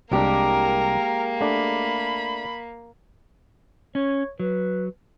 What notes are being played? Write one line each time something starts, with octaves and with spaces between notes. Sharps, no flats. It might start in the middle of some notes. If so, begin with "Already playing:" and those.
C2 G#3 A#3 D4 G4 A#4
A3 D4 B5
C#4 C#5
F#3 B4